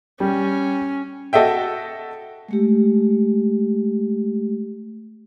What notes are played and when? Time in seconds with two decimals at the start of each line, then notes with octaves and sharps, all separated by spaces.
0.20 G3 C#4
1.33 F#4 A4 D#5 E5 G5
2.49 G#3 A3 G4